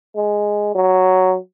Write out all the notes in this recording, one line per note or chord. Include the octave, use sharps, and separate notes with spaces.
G#3
F#3